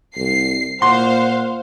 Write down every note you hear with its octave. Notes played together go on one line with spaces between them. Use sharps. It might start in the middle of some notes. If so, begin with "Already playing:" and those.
C2 C7
A#2 C5 F5 F#5 C6